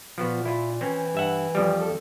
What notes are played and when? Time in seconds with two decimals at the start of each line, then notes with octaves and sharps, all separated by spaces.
0.18 A#2 F3 B3 F#4
0.45 E4 F4
0.81 E3 C4 C#4
1.15 G2 E5 F#5
1.55 F2 F3 G3
1.80 A4